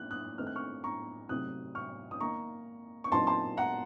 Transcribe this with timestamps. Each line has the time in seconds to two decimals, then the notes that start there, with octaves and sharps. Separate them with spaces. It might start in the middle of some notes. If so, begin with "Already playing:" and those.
Already playing: D#3 A#3 C#4 F#6
0.11 D#6 F#6
0.38 D#3 A3 C4 D#4 F6
0.47 F#6
0.56 C#6 F6
0.84 A#5 C#6
1.29 C3 F#3 A3 C4 D#4 D#6 F#6
1.75 C#6 F6
2.11 D#6
2.20 D#3 A#3 D#4 A#5 C#6
3.04 C#6
3.12 A#2 F#3 C4 D#4 A5 C6
3.27 A5 C6
3.57 F#5 A#5